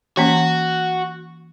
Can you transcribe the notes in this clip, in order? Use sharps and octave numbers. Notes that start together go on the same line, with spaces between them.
E3 A#3 C#4 F#4